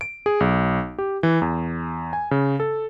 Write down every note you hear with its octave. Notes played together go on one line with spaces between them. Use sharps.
D7
G#4
B1
G4
E3
E2
G#5
C#3
A4